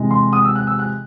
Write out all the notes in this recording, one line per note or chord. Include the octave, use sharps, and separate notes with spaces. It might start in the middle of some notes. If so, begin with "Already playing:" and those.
Already playing: C3 E3 G#3
C6
D#6
E6
F#6
E6
F#6